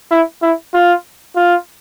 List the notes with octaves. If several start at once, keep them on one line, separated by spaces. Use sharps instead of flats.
E4
E4
F4
F4